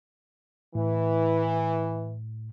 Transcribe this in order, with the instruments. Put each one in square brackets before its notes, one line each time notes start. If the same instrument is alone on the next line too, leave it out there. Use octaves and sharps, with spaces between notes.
[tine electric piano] A2 [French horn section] E3